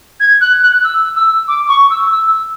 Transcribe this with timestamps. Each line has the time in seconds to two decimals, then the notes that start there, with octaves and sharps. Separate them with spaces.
0.19 G#6
0.40 F#6
0.62 F#6
0.83 E6
1.15 E6
1.47 D6
1.68 C#6
1.90 E6
2.11 E6